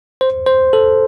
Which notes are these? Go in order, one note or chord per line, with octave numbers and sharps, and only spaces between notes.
C5
C5
A4